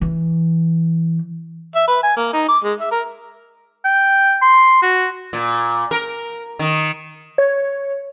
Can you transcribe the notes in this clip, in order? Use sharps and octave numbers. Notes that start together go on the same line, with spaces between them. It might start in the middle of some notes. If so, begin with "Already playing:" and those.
E3
E5
B4
G#5
A#3
D#4
D6
G#3
E5
A#4
G5
C6
F#4
A#2
A#4
D#3
C#5